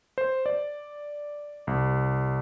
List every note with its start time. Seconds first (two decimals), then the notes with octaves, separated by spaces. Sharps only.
0.18 C5
0.46 D5
1.67 C2